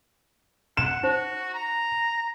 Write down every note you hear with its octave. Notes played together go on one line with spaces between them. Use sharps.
F#5 E7
D#4 F#4 C5
A#5